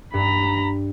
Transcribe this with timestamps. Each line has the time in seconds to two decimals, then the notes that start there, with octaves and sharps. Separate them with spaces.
0.14 G2 A#5 B5